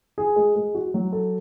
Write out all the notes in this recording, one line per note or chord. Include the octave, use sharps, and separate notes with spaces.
G#4
G#3
G#3
F#4
F#3
A4